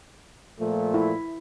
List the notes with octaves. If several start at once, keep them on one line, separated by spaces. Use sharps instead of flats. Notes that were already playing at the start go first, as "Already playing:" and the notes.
A#2 F3 A3
E4